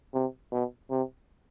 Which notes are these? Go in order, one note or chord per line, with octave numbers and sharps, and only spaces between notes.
C3
B2
C3